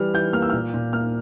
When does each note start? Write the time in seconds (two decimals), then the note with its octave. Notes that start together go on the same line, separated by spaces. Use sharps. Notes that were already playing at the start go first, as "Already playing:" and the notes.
Already playing: E3 G3 F6
0.13 E3 G6
0.33 A#3 F6
0.42 E6
0.50 A#2 F6
0.74 A#2
0.93 A#3 F6